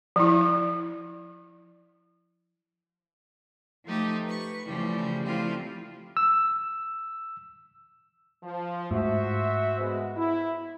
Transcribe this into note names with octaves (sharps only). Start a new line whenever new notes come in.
F3 E4
F3 A3 D#4 G4
B4 C#6
C#3 E3 F3 G3 A3
F3 G3 A3 C4 E4 F4
E6
F3
G#2 A3 F#4 C5 E5
G#3 B3
E4